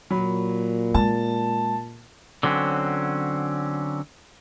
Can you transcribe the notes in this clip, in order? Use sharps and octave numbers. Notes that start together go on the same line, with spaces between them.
A#2 F#3 B5
G#3 A5
D3 F#3 C4 C#4